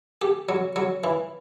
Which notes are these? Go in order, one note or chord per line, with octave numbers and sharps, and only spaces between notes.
G4
F#3
F#3
E3